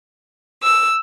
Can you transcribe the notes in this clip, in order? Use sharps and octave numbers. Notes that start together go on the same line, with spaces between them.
E6